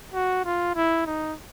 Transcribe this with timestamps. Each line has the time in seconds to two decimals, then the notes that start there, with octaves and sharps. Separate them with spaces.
0.14 F#4
0.45 F4
0.75 E4
1.06 D#4